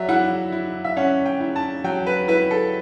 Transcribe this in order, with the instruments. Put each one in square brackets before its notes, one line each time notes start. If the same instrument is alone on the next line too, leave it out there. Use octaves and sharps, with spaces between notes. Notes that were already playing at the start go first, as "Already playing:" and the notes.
Already playing: [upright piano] F#3 D5 E5
E4 F#5
E4
E5
C#4 F#5
G5
E4
A5
F#3 G5
B4
E4 B4
A4